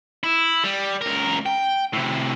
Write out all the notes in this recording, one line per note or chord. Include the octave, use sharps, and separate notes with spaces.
E4
G3
C#2 A#4
G5
A2 C3